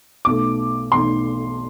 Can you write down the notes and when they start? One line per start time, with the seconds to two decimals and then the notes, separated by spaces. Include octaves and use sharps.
0.25 B1 B2 A3 D6
0.92 B1 B2 A3 C6